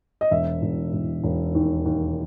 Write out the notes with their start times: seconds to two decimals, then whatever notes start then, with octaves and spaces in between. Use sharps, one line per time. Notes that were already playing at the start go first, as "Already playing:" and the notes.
0.21 D#5
0.31 E1 E5
0.62 E1
0.93 E1
1.24 E1
1.55 D#2
1.85 D#2